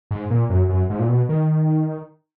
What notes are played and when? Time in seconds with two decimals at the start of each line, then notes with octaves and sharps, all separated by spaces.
0.11 G#2
0.31 A#2
0.50 F#2
0.69 F#2
0.90 G#2
0.99 A#2
1.09 B2
1.29 D#3